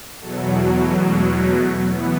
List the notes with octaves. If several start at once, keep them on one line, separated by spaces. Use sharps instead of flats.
E2 B2 F#3 A4
F#4
A3
G#3
A3
E3 B3